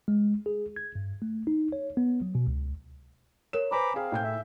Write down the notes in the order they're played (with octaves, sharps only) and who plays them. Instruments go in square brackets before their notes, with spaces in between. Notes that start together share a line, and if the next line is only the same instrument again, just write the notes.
[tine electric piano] G#3
G#4
G#6
G2
A3
D#4
C#5
B3
F#3
B2
C#2
[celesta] A#4 C#5 [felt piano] E7
[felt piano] B4 C5 [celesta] G#5 [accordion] A#5 B5 D6
[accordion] C4 F5 [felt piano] G#4
[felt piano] A2 G5 G6
[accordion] E5